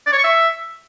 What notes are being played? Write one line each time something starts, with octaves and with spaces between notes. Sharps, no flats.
D5
C#5
C#6
E5